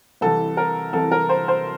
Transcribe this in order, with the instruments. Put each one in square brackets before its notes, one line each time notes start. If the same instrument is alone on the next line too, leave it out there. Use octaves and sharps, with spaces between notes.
[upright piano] C2 C3 E3 A4
A#4
C2 C3 E3 A4
A#4
C5
C5